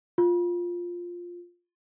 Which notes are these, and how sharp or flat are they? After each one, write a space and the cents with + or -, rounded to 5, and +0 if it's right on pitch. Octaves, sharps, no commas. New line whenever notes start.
F4 +5